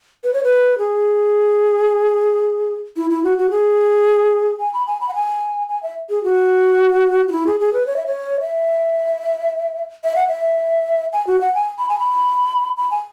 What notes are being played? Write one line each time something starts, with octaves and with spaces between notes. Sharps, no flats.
B4
C#5
B4
G#4
E4
E4
F#4
F#4
G#4
G#5
B5
G#5
B5
F#5
G#5
G#5
E5
G#4
F#4
F#4
E4
G#4
G#4
B4
C#5
E5
C#5
E5
E5
F#5
E5
G#5
F#4
F#5
G#5
B5
G#5
B5
B5
G#5